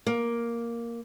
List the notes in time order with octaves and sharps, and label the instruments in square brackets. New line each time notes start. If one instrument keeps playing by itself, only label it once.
[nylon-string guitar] A#3